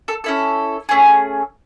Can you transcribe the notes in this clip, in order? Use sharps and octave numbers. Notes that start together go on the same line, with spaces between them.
A4
C#4 E4 A4
A3 C#4 G#4